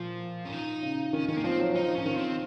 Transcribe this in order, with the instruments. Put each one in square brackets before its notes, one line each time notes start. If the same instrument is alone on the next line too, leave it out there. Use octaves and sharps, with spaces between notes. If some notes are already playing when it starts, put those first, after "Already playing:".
Already playing: [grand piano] A#2 [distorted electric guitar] F3
[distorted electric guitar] C#4
D#4
[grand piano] C#3
[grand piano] D#3 [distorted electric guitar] C#4
[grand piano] D#3 [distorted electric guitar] C#4
[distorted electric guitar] A#3
[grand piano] F3 [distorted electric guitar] C4
[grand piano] F#3
F#3
[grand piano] F3 [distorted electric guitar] D#4
[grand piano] F3 [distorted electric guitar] C#4
[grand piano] D#3
[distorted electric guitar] C4